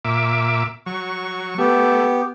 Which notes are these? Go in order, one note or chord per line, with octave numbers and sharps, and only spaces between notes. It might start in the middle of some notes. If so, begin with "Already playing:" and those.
A#2 E5 D6
F#3 C#6
A3 B3 G4